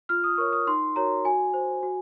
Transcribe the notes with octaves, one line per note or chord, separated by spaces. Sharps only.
F4 F6
D#6
A#4 C#5 C#6
D#6
D#4 C6
F#4 A#4 C#5 A#5
F#4 G#5
C5
F#4